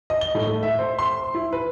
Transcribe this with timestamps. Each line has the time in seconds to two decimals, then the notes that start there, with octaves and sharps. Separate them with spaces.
0.10 D#5
0.21 G7
0.35 A2
0.47 A3
0.63 E5
0.79 C5
0.99 C6
1.35 E4
1.53 B4